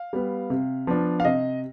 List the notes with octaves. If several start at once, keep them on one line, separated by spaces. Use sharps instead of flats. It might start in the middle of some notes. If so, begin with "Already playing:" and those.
Already playing: F5
G3 B3
C3
F3 B3 D4
F5
C3 D#5